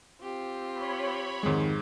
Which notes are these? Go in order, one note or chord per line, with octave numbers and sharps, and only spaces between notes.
C4 F4 G4
C#5 B5
F2 G#2 D#3 G#3